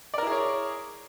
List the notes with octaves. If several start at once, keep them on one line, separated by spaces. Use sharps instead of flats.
E4 G#4 A#4 C#5 D5